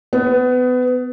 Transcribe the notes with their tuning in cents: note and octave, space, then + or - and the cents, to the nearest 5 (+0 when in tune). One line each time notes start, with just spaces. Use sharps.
B3 +25